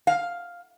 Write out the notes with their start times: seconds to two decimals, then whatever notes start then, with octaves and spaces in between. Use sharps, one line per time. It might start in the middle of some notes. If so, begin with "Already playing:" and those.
0.07 F5